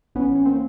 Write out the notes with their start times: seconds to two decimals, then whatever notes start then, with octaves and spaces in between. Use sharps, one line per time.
0.15 A1 B3 C#4
0.35 C#4
0.46 A#3 C4